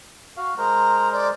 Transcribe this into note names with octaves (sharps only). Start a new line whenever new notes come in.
F#4 F5
G#3 A#4 C5 A#5
D5